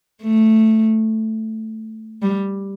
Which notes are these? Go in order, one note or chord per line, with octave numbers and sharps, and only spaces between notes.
A3
G3